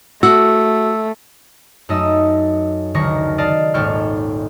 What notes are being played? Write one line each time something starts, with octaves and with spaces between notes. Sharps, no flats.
A3 F#4 E6
F#2 A3 D#4 D#5 D#6 E6
F#1 D2 D#3 C#6 A#6
D5 D#5 F5 A5
D#1 G#1 A4 G5 C#6 F6